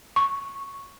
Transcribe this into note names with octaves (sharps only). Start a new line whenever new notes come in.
C#6